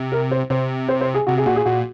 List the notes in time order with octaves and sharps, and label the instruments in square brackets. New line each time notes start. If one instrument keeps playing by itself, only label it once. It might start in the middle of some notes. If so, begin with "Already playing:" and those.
Already playing: [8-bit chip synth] C3
[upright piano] A#4
C5
[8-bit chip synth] C3 [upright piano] C5
[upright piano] C5
C5
G#4
[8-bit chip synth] C3 [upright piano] F#4
[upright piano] G#4
[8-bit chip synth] A#2 [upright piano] F#4
[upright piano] G#4
[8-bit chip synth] A#2 [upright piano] F#4